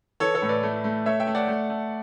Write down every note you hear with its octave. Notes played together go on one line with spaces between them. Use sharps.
E3 A4 C#5
A4 C#5
A2
B4 D5
A3
A3
A3 C#5 E5
E5 G5
A3
D5 F#5
A3
A3